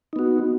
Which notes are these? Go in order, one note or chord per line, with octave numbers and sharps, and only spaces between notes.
B3 D#4 F#4